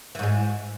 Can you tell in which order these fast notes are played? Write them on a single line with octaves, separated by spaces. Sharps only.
E3 G#2 G#3